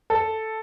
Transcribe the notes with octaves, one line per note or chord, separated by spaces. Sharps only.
A4